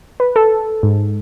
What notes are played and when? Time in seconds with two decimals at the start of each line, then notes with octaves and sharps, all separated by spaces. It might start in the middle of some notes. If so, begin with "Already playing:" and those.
0.20 B4
0.36 A4
0.83 G#2